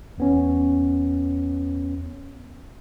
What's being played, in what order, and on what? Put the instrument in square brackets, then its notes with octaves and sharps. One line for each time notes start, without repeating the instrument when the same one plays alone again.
[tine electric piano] E2 B3 C#4